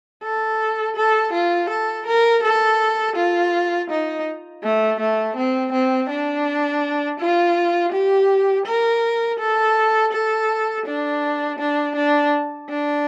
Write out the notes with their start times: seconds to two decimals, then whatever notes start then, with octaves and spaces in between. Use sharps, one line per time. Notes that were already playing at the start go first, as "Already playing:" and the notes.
0.24 A4
0.96 A4
1.33 F4
1.70 A4
2.06 A#4
2.43 A4
3.16 F4
3.90 D#4
4.63 A3
5.00 A3
5.37 C4
5.73 C4
6.10 D4
7.20 F4
7.92 G4
8.66 A#4
9.39 A4
10.13 A4
10.86 D4
11.59 D4
11.96 D4
12.70 D4